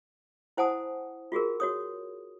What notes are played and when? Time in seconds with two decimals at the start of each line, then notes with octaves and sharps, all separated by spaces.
0.57 E4 C5 F#5 G#5 A5 D#6
1.32 F4 F#4 G#4 A#4
1.60 F#4 C#5 D#6